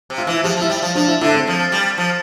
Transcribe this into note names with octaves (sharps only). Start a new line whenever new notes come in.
C3
F4
E3 E4
F3 G4
F3
E4
G3
F3
F3 D4
E4
D3 E4
C4
F3
G3
F3